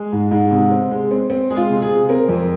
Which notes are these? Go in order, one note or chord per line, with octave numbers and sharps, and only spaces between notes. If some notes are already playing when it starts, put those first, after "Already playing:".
Already playing: G#3 G#4
G#2
G#2
C3
C4
G#3
C4
C4
G#3 G#4
F4
C3
G#4
C3
C4 A#4
F2